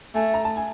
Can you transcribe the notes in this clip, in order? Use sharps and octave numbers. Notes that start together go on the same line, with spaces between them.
A3 G#5
A#5
A5
G#5